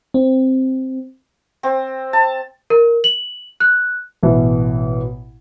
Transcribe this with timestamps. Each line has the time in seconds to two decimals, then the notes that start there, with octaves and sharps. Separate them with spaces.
0.14 C4
1.63 C4
2.13 A5
2.70 A#4
3.04 F#7
3.60 F#6
4.23 A1 B2 E3 B3